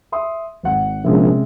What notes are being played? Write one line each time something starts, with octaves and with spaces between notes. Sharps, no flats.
E5 C6 D#6
G#1 F#5
A#1 C3 G#3 C#4